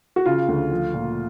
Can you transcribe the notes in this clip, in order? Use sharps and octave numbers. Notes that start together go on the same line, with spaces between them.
F#4
C#3 F4
D2
F3
A#2